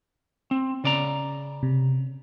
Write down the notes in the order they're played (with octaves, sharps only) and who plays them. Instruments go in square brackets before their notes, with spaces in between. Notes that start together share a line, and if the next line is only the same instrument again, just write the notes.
[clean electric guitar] C4
C#3 D5 A#5
[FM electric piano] C3